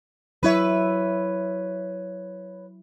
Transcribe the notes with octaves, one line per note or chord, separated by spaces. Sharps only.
F#3 E4 B4 C#5 E5